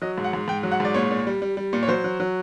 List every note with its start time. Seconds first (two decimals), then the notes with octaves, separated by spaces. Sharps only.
0.02 F#3 D#5
0.18 G#2
0.24 F#5
0.33 G#2
0.48 G#2 G5
0.63 F#3
0.72 F#5
0.80 G#2 D5
0.94 A#2 C#5
1.11 A#2
1.27 G3
1.42 G3
1.57 G3
1.73 A#2
1.83 C#5
1.88 F#3 C5
2.04 F#3
2.20 F#3